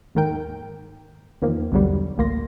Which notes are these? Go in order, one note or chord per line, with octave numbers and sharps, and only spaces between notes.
D#2 G#2 D#3 A#4 G5 D7
E2 D#3 F3 A#3
B1 E2 G2 D3 F#3 G3
A1 D2 A#3 C6 A#6